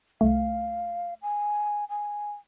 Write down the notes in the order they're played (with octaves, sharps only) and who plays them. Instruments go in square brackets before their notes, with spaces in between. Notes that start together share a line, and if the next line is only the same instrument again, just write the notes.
[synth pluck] C2 A3 [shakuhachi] F5
[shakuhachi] G#5
G#5